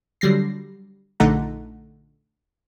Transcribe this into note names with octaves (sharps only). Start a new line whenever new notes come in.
D3 F#3 G3 A#6 C7
A#1 D3 A3 D#4 F#5 A#5